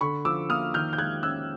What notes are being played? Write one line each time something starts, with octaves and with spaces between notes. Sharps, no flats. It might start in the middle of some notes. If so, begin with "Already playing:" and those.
D3 B5 C#6
F3 D6 E6
A#3 D#6 F6
D#3 F6 G6
G6
G#3 F#6 G#6
C#4 E6 F#6